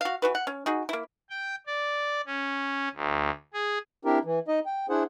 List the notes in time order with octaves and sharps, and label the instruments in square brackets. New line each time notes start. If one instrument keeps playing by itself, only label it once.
[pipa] F#4 F5
E3 F#4 B4
F#5
C#4
D#4 F#4 G#4
A#3 E4
[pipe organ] G5
D5
C#4
D2
G#4
[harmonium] C4 D4 E4 G4 A#4
E3
D#4 D#5
G5
D4 E4 G#4 C5 F#5